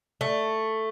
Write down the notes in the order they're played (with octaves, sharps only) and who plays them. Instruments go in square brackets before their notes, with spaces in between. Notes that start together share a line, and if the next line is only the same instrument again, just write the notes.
[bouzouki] A3